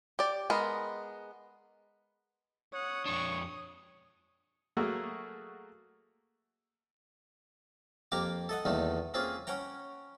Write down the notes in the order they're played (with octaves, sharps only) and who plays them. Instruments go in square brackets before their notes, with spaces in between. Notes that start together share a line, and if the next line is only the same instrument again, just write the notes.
[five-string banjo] G4 D5
G#3 B3 A#4
[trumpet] C#5 [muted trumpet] F#5 [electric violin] D#6
[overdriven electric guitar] F2 D4 [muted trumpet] C#6
[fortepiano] F#3 A3 A#3 F#4 G#4
[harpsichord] F2 A#3 G4 A#5 D6
A4 D#5 F#5
E2 A#2 D#3 A3 D#4
A#3 C4 C#4 F4 G#4
C#4 C#5 F#5 G5 A#5